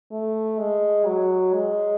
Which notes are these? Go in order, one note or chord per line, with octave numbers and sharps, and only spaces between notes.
A3
G#3
F#3
G#3